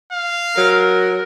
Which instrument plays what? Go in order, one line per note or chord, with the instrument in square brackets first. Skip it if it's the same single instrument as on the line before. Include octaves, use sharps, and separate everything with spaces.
[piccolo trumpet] F5
[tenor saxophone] F#3 [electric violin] A#4